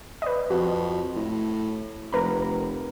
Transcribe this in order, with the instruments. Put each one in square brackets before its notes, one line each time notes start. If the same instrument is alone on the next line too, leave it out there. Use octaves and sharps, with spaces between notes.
[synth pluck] B4 D5 D#5
[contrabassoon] F2 [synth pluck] F#4
[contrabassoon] A2
[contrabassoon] F1 [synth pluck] A#4 B4 A#5